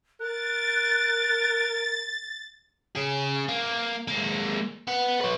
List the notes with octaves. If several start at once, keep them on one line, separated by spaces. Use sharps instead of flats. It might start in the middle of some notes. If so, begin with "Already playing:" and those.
A#4 F#6 A6
C#4 G#4
A#3
G#3 A#3
B3
B4 C#5